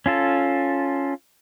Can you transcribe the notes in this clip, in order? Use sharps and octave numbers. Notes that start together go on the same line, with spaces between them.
C#4 F4 A4